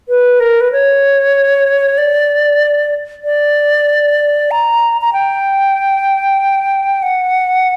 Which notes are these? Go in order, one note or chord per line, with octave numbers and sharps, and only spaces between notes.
B4
A#4
B4
C#5
D5
D5
A#5
A#5
G5
F#5